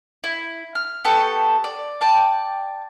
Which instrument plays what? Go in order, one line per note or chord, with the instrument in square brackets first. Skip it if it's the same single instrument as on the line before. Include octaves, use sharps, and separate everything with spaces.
[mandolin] E4
F6
B3 G4 A4 C#6
D5
D5 G5 A5 D6